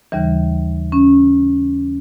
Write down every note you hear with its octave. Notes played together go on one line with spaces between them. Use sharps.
D#2 C#3 E3 G3
C#4